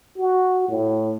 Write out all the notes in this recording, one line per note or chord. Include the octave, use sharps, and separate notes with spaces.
F#4
A2